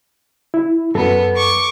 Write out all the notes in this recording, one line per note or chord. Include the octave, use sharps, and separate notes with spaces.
E4
F#2 B3 A4
C#6 D6